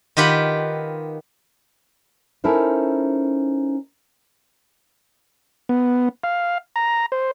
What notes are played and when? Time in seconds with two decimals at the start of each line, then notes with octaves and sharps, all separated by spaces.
0.17 D#3 F4 G4 B4 F#5
2.44 C#4 D#4 E4 A4 A#4 C5
5.69 B3
6.24 F5
6.76 A#5
7.12 C5